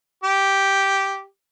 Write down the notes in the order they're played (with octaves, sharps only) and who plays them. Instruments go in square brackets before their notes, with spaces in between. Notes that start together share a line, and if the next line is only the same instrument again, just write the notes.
[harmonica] G4